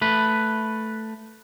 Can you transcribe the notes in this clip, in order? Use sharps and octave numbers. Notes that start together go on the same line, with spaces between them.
A3 B4